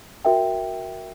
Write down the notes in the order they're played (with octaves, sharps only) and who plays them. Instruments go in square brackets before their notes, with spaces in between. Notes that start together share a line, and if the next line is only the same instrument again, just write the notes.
[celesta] F#4 A#4 E5 G5